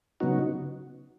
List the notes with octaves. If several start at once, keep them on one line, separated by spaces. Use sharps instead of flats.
C#3 F#3 B3 D#4 F#4